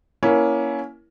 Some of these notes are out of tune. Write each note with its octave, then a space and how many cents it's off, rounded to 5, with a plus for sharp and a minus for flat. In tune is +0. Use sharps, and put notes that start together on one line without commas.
A#3 +20 C#4 +15 E4 +5